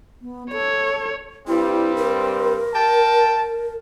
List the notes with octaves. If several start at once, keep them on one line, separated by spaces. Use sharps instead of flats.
B3
A4 C#5
G2 G3 C4 E4
A#4
G5 A5